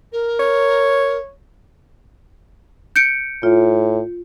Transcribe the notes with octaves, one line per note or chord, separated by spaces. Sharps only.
A#4
C#5
G6 C#7 D7
A2 F4